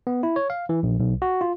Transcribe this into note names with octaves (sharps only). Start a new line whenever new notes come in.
B3
E4
C#5
F5
E3
A#1
B1
F#4
F4